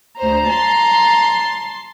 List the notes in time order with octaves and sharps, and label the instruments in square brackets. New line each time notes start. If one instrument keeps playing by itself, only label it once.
[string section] D2 C5 [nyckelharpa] A#5
[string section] A5 C6